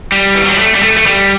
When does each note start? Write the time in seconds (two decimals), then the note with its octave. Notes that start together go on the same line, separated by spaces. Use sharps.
0.12 G3
0.35 E3
0.43 F#3
0.51 G3
0.58 A3
0.75 G3
0.83 A3
0.97 A3
1.06 G3